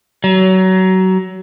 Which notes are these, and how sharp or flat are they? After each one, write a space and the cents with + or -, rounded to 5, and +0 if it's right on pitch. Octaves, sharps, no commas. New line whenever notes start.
F#3 +25